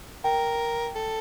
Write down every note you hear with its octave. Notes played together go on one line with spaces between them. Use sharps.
A#4 G5
A4